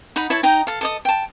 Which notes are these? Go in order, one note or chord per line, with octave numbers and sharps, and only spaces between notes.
D#4 F#5 B5
E4 C#5 A5
D#4 G5 A#5
A4 F5
A4 D#5 D#6
G5 A5